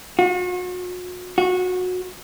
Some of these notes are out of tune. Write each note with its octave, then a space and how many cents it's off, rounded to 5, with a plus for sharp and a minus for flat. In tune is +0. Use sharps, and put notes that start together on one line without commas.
F#4 -40
F#4 -20